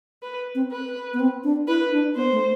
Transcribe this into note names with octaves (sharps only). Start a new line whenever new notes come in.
B4
C4
B4
B3
C4
D4
E4 B4
D4
B3 C5
A3